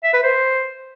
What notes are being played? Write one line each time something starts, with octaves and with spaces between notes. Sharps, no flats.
E5
B4
C5